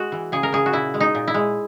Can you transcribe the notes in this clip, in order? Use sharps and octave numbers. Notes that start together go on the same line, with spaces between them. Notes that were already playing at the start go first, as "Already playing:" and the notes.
Already playing: G#3 F#4
E3
C#3 G#4
A#4
C#3 G#4
F#4
A#2 E4
G#3
D#4
A#2
E4
G#3